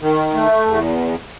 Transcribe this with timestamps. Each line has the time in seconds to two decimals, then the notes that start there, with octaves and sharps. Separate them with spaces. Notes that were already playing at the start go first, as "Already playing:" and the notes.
0.02 D#3
0.34 A3
0.66 E2